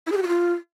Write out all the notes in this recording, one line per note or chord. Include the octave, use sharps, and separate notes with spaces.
E4
G#4
G4
F#4
F4